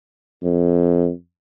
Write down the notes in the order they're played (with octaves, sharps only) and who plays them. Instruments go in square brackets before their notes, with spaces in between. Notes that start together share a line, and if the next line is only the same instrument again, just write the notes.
[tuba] F2